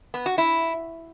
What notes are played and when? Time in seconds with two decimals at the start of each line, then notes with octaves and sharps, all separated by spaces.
0.14 B3
0.26 F#4
0.38 E4